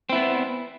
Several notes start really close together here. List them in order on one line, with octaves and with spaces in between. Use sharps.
C4 E4 B3